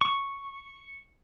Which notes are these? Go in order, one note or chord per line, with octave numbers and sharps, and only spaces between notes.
C#6